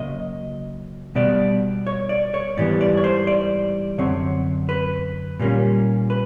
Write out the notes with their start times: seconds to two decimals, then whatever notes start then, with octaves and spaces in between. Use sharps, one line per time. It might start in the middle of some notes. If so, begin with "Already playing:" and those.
Already playing: C#3 F#3 A#3 D#5
1.15 B2 G3 B3 D5
1.87 C#5
2.09 D5
2.34 C#5
2.57 G#2 E3 G3 B3 D5
2.81 D5
2.97 C#5
3.04 C5
3.27 D5
3.98 F#2 D3 F#3 C4 C#5
4.69 B4
5.40 A#2 G3 A#3 C#4
6.10 B4